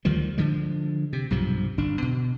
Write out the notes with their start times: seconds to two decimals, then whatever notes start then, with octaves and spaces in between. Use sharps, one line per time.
0.05 D2 D#3 F3 G3
0.38 D3 F3 G#3
1.13 C3
1.31 B1 G2 C3 F3
1.78 G1 D4
2.02 B2